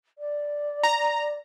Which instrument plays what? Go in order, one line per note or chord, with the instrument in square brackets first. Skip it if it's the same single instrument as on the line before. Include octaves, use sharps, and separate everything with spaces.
[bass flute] D5
[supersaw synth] A#5